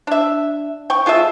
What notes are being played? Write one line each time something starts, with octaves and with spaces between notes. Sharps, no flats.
D4 E5
G5 C#6
G#3 F4 A4 E5